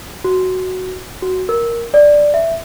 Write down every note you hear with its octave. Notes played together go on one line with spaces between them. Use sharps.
F#4
F#4
A#4
D5
E5